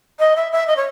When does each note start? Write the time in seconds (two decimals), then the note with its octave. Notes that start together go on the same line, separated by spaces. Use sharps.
0.19 D#5
0.36 E5
0.52 E5
0.67 D#5
0.76 C#5